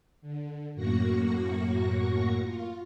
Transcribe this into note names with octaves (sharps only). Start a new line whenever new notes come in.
D3
F#2 A2 A#3 F#4 C#6 A#6
F4